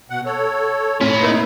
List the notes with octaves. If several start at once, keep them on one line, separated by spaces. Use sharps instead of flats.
B2 F#5
A4 C#5
A2 C#4 C#5 B5 C6
A#3 D#4 E4 B4